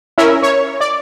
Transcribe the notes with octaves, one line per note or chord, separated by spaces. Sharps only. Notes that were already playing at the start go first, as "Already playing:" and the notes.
C#4 E4 A#4 E5
C#5
D5